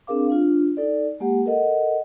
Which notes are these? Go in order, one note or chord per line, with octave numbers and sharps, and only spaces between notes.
C4 D4 G#4 A#4 F5 D6
D4 F4
D#4 A4 D5
G#3 A#3 G4 F#5
A4 A#4 D#5 F#5